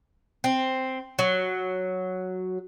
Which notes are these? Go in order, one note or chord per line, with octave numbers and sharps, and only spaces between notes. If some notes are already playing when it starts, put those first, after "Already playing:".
C4
F#3